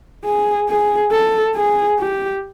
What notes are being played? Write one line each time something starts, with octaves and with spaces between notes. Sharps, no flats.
G#4
G#4
A4
G#4
G4